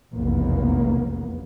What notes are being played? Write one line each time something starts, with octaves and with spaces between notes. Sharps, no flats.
F1 B1 E2 C#3 A#3 B3